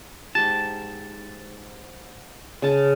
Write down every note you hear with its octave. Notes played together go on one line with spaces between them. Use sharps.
G#2 G4 A5
C#3 A5